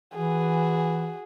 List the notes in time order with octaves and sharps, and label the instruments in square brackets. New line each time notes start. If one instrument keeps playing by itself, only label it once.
[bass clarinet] E3 [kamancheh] F#4 G#4